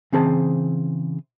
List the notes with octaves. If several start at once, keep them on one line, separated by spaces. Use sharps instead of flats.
C#3 E3 C4 G#4 C5 A5